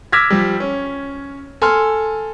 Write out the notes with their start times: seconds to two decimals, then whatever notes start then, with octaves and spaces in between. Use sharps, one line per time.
0.12 D6 E6 F6 G#6 A#6 B6
0.30 F3 G3
0.60 C#4
1.62 A4 G#5 C6 F6